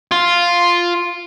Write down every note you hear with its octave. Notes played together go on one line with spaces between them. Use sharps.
F4